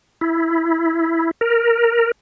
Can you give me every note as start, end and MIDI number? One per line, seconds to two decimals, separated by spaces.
0.21 1.31 64
1.41 2.11 70